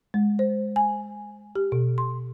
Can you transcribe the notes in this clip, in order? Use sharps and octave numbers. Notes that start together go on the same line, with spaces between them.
G#3
C5
G#5
G4
B2
C6